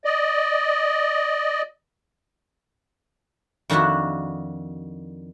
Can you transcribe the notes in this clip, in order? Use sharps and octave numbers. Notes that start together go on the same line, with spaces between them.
D5 D#5
F2 D#3 D4 E4 F#4